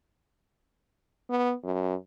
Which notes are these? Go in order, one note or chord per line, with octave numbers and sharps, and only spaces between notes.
B3
F#2